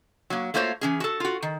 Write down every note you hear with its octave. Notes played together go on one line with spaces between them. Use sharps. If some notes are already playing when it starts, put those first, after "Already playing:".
F#3 A#3
A3 A#3 F4 F#4 C5 C#5
E3 C#4 G#4
F#4 A4
F4 F#4
D#3